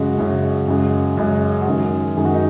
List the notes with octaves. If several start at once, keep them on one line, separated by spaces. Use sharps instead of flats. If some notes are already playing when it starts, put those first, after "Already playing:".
Already playing: F#2 C#3 G#3 F#4
F#2 C#3 G#3
F#2 C#3 G#3
F#2 C#3 G#3
F#4
F#2 D#3 G#3 G#4
F#2 D#3 G#3 G#4
F#4
D#4